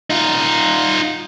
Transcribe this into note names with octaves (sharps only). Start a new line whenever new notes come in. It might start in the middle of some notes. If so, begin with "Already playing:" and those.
D#4 F4